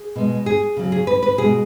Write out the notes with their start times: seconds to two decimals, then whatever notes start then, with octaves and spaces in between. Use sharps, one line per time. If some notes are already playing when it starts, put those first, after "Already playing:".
Already playing: G#4
0.16 B2 G#3
0.46 G#4
0.77 C#3 F#3
0.92 G#4
1.07 B4
1.23 B4
1.38 B2 G#3 G#4